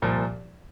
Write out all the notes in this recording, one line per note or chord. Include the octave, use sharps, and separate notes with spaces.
C2 A#2 F3